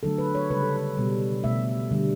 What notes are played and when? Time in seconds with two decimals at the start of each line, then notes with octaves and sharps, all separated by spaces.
0.03 D3 F#3 A3 A4
0.18 B4
0.35 C#5
0.50 C#3 G3 B4
0.63 A4
0.76 B4
0.98 B2 G3
1.44 B2 A3 E5
1.91 D3 G3